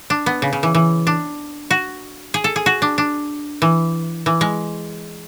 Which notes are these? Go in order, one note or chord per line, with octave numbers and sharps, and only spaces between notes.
D4
B3
C#3
C#3
E3
E3
D4
F#4
G#4
A4
G#4
F#4
D4
D4
E3
E3
G#3